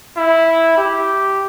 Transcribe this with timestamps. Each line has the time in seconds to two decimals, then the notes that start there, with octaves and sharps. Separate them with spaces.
0.17 E4
0.78 G4